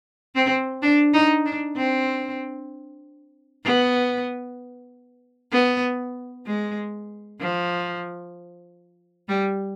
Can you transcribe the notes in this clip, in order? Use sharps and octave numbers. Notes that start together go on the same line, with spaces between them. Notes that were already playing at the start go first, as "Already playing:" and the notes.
C4
D4
D#4
D4
C4
B3
B3
G#3
F3
G3